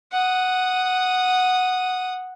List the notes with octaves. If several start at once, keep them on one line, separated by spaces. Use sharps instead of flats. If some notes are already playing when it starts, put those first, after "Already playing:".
F#5 D#6